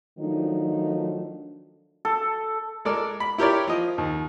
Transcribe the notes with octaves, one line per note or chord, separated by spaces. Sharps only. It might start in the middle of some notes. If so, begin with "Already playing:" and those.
D#3 F3 F#3 A3 D4 D#4
A4
G#3 A4 A#4 D5
B5
E4 G4 A#4 C#5 D5
F3 D#5
D#2